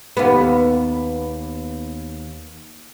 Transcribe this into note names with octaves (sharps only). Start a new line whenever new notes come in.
D#2 B3